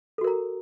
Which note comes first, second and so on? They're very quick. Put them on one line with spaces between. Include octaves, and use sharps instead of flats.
A4 F#4 A#4 A#5